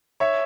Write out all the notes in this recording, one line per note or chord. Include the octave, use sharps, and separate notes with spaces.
C#5 E5